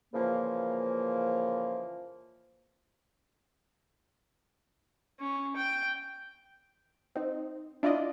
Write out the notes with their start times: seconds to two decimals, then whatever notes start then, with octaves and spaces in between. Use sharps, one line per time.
0.13 A#2 C#3 E3 F3 A#3
5.19 C#4
5.56 G5
7.15 C4 D#4
7.83 D4 E4 F4 D5 D#5